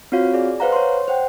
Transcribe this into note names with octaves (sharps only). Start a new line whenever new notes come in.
C4 F4 F#4 C#5 F5
G#4 D5
B4 C5 F5 F#5 A#5
C#5 C6
C5 F#5 G5